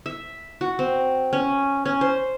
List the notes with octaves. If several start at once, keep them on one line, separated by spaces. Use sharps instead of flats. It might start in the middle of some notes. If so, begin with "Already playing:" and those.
E5
F#4
C4
C#4
C#4
C5